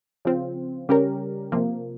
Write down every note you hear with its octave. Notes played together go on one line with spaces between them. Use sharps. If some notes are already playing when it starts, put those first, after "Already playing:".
C#3 F3 C4 F4
C#3 G3 C#4 G4 A#4
C3 F3 A#3